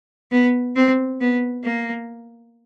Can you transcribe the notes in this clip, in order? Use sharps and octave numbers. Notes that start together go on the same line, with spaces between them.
B3
C4
B3
A#3